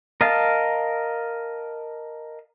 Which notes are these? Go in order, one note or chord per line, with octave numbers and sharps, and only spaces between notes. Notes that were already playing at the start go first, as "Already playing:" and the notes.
A#4 D#5 F5 A5